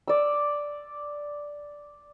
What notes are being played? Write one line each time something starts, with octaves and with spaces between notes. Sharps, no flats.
D5 E6